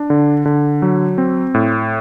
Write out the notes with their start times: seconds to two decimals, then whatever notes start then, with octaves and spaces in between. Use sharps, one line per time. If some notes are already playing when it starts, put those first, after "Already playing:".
Already playing: D4
0.10 D3
0.46 D3
0.82 F#3
1.18 C4
1.54 A2